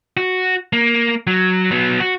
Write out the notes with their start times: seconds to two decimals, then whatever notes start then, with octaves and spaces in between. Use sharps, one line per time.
0.17 F#4
0.73 A#3
1.27 F#3
1.71 F#3 B3
2.00 F#4